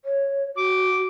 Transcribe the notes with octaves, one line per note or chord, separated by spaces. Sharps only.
C#5
F#4 D6